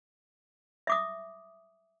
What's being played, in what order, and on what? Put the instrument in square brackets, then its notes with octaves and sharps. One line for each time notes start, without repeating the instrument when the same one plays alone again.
[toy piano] E5 D6 D#6